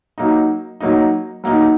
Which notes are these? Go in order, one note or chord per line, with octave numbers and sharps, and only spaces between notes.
F#3 A#3 D#4
F#3 A#3 D#4
F#3 A#3 D#4